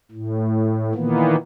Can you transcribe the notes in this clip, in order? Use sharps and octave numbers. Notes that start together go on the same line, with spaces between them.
A2
A#2 D#3 E3 A#3 B3